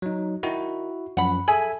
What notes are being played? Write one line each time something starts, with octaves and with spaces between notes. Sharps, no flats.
F#3 D#4
D#3 E4 F#4
F#2 F3 F#5 B5
G#4 A4 E5 G#5